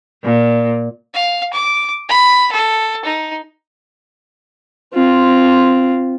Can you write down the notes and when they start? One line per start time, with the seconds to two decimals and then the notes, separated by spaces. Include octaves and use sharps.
0.24 A#2
1.14 F5
1.53 D6
2.09 B5
2.52 A4
3.05 D#4
4.93 C4 F4